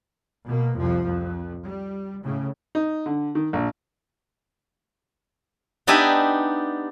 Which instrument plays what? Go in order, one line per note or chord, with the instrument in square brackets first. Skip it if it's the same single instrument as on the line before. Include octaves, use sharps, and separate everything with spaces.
[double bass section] B2 A#3
C2 F2 F3
F2
G3
A2 C#3
[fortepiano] D#4
D3
D#3
A#1
[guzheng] B3 D4 D#4 G4 E5 G#5